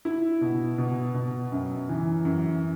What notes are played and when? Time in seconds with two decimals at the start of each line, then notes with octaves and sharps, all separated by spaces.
0.05 E4
0.41 B2
0.78 B2
1.14 B2
1.52 F#2
1.89 E3
2.25 F#2